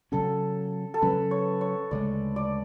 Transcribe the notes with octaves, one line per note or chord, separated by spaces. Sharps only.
C#3 F#3 C#4 A4
A4
C#3 F#3 C#4 B4
C#5
C#5
D2 C#3 G#3 D5
D5